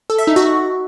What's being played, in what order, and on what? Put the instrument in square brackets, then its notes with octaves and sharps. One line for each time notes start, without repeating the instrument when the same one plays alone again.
[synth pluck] A4
E5
D#4
F#4